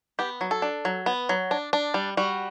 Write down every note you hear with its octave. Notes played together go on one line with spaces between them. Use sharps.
B3 G4
F#3
A4
D4
F#3
B3
F#3
D4
D4
G3
G3 F#4